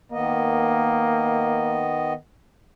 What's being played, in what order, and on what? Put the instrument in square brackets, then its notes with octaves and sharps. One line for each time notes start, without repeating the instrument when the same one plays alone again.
[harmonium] D#3 B3 D#5 [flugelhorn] A#3